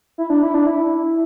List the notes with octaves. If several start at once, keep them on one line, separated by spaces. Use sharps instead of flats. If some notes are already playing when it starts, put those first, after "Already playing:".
E4
D4
E4
D4
E4